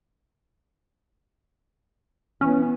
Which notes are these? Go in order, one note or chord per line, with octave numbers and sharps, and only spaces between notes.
E3 B3 C#4